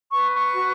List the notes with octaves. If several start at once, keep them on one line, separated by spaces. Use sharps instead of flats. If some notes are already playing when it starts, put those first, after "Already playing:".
B4 C#6
C#6
F#4